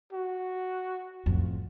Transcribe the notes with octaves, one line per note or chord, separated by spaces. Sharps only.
F#4
F2 A2